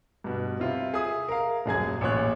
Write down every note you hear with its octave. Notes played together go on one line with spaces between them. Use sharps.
G2 B2
C3 E4 F4
G#4 E5 D#6
A#4 F5
D#1 F#2 G#4 G#6
A1 A#2 C#5 F#6